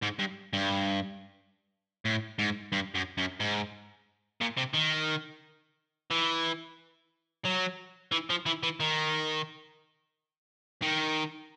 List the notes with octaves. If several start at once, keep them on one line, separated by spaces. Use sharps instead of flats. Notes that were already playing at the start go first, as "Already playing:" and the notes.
G#2
G2
G2
A2
G#2
G2
F#2
F#2
G#2
A#2
C3
D#3
E3
F#3
E3
F3
E3
E3
D#3
D#3